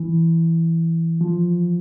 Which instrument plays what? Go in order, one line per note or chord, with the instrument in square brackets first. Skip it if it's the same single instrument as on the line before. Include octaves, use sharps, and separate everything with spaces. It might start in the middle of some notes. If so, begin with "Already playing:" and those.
Already playing: [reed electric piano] E3
F3